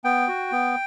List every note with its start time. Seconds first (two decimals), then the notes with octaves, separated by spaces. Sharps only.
0.04 B3 G5
0.28 F#4
0.52 B3